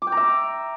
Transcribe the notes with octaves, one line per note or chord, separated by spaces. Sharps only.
D6
G5
A#5
E5